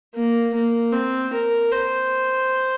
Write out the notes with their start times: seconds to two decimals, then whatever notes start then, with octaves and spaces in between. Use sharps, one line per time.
0.15 A#3
0.54 A#3
0.93 C4
1.34 A#4
1.72 C5